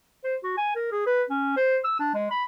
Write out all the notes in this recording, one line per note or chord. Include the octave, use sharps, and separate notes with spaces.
C5
F#4
G#5
A#4
G#4
B4
C#4
C5
E6
D4
G#3
B5